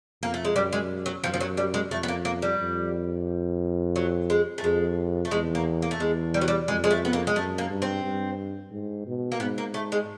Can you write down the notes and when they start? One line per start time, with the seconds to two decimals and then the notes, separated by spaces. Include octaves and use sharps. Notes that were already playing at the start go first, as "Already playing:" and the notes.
0.22 F2 A#3
0.34 A3
0.45 G#3
0.55 F#2 G3
0.73 G#3
1.06 F#3
1.24 F#2 F3
1.34 F3
1.40 F#3
1.57 G3
1.74 G#3
1.91 F2 A3
2.03 B3
2.08 A#3
2.25 A#3
2.42 G3
2.59 F2
3.96 F#3
4.30 G#3
4.58 A3
4.64 F2 G#3
5.25 A3
5.31 E2 G#3
5.55 A#3
5.82 A#3
5.91 A3
6.00 E2 G#3
6.34 G3
6.41 F#3
6.48 G3
6.68 F2 G#3
6.84 G#3
6.91 A3
7.05 B3
7.13 A#3
7.27 G#3
7.36 F#2 A3
7.58 A#3
7.70 G2
7.82 C4
8.04 G2
8.72 G#2
9.07 B2
9.32 A#3
9.40 G#2 B3
9.58 A#3
9.74 A3
9.92 G#3